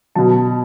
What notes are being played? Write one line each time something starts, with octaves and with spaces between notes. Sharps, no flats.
B2 F#3 A5